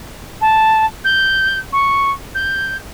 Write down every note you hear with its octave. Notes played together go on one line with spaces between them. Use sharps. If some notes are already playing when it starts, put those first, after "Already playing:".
A5
G6
C#6
G6